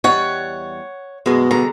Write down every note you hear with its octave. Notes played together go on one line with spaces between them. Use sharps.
E2 G3 C#5 D#5 F#5
F#2 B2 G#3
D3 G3 G#3 A#5